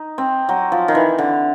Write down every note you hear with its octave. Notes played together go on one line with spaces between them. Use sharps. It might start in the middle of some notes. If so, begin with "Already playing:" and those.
Already playing: D#4
C4
F#3
F3
D#3
E3
D3